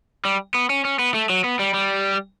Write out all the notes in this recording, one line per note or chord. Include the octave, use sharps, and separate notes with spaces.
G3
B3
C#4
C#4
B3
A3
F#3
B3
G3
G3